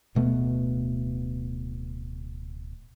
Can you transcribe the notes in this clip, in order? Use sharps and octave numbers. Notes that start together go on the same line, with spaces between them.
D1 B2 A3 B3